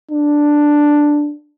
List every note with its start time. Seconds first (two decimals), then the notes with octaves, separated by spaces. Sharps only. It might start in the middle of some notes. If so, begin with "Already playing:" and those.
0.11 D4